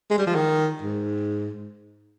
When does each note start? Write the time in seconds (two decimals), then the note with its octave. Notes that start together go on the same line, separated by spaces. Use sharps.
0.10 G#3
0.18 G3
0.27 F3
0.35 D#3
0.82 G#2